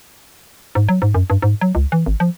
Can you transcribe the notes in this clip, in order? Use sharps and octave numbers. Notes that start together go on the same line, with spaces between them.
G#2
F#3
G#2
F#2
G2
G#2
F#3
C#2
E3
G#1
F3